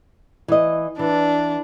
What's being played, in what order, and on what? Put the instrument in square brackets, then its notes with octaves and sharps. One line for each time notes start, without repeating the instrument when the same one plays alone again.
[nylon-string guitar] E3 D#5
[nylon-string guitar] E3 [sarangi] D4